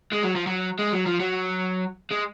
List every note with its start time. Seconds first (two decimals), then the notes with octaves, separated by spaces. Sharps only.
0.13 G#3
0.24 F#3
0.36 F3
0.47 F#3
0.79 G#3
0.93 F#3
1.06 F3
1.20 F#3
2.11 G#3